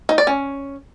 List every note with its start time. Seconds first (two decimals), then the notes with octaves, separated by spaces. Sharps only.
0.09 D#4
0.18 D5
0.27 C#4